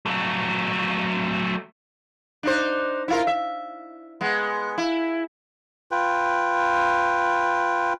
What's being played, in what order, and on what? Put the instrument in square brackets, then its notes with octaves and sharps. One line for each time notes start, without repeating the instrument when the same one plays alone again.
[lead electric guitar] F#3 A3
[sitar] D4 D#4 C5
E4 F4 A#4
E5
G#3 B3
E4
[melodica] F4 B4 G5